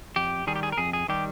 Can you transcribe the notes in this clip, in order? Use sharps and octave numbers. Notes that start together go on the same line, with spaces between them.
F2 G4
D#3 G3 G#4
G4
G#4
A#4
F2 G#4
G#4
D#3 G3 G4